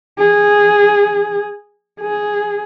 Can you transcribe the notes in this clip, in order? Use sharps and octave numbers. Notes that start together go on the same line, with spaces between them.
G#4
G#4